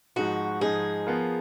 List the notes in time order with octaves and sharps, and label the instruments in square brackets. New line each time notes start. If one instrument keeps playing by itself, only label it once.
[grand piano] G#2 F3 G#3 D#4 [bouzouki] F#4
[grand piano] G#2 F3 G#3 D#4 [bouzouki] G#4
[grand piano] F3 B3 F4 A#4